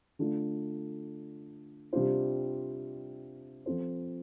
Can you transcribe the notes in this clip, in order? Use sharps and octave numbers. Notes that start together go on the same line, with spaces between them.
D3 A3 D4 F4
C3 G3 D4 F4 C5
F3 C4 F4 A4 C5